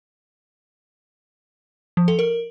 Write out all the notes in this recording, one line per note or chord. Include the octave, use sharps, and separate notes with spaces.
F3
A4
A#4